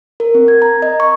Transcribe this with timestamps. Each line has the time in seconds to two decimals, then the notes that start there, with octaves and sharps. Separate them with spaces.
0.20 A#4
0.35 C4
0.48 G#6
0.62 A#5
0.82 D#5
1.00 C#6